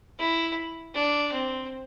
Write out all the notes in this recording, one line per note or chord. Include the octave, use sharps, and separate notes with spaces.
E4
D4
C4